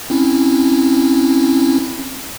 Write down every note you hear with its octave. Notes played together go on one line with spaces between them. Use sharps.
C4 C#4 E4